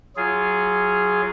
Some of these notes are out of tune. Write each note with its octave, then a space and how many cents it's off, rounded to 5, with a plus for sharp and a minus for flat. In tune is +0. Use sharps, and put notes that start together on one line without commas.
F#3 +0 F4 -15 G#4 +0